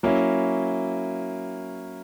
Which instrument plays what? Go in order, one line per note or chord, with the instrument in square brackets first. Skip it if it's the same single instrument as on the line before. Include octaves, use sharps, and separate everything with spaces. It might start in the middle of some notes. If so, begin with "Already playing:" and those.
[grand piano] F#3 A#3 C#4 E4